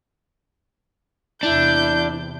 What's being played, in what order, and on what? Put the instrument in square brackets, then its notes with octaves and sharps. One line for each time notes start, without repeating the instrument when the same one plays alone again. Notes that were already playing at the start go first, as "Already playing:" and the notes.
[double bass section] E2 C3 [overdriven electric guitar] D4 [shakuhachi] E4 [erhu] G6